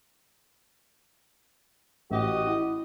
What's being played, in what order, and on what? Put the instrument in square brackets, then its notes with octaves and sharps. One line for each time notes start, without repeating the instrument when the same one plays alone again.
[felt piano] A1 [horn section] F#4 G4 D#5
[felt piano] E4